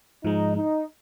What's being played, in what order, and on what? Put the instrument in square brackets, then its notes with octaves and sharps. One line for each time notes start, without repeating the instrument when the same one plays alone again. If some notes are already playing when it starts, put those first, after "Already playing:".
[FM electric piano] G#2 F3 G#3 [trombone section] D#4
[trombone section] D#4